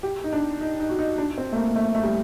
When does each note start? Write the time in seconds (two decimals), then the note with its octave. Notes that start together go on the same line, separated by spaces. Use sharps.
0.03 G4
0.24 D#4
0.33 D4
0.61 D#4
0.80 D#4
0.89 F#4
0.99 D#4
1.18 D4
1.38 C4
1.53 A3
1.56 A#3
1.76 A3
1.95 A3
2.03 G3